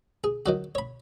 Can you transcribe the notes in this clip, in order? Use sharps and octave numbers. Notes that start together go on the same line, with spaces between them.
G#4
D#3 F#3 F#4
C#5 B5